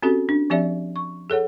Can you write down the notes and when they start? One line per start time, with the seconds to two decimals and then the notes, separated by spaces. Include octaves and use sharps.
0.03 C4 C#4 F#4 G4 A4
0.29 D4
0.50 F3 C4 G4 D5 E5
0.96 C#6
1.30 G#4 A4 C#5 F#5